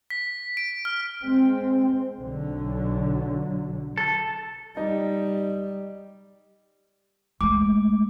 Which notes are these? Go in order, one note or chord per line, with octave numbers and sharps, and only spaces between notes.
B6
D7
F6
G#3 C4
B1 D3 F#3
A4
G3 D#4
G#3 A3 D6